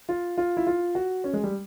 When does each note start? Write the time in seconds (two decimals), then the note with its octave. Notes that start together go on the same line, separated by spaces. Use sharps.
0.09 F4
0.37 F4
0.57 E4
0.67 F4
0.95 F#4
1.24 C#4
1.33 G#3
1.44 G3